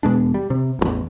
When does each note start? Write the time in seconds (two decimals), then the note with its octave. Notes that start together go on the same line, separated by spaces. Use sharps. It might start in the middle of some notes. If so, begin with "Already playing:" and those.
0.03 E1 B2 G#3 D4
0.34 G3
0.50 C3
0.79 E1 A1 E2